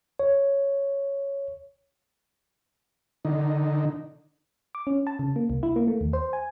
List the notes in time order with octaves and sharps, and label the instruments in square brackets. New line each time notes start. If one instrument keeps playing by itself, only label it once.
[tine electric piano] C#5
[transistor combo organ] D3 D#4
[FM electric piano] D6
C#4
A5
C#3
A#3
C2
E4
A#3
A3
D#2
C5
G#5